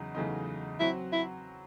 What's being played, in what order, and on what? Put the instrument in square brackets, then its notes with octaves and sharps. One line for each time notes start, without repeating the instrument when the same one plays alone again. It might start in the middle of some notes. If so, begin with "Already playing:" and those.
Already playing: [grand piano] E2 C#3 F#3 D#4
E2 C#3 F#3 A3 D#4
[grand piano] F#3 C4 F#4 [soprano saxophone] E4
[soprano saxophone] E4